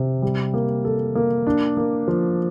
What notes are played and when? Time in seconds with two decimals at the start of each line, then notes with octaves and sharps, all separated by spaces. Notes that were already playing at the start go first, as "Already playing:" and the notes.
Already playing: C3
0.22 G3
0.54 A#3
0.85 A4
1.15 A#3
1.47 D4
1.77 A#3
2.08 F3